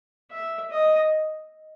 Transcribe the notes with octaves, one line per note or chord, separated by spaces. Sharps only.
E5
D#5